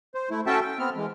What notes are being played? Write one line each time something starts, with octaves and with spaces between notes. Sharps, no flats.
C5
A3 E4
C#4 F#4 A4 E5 G5 A5
G5
B3 C4 F6
E3 G#3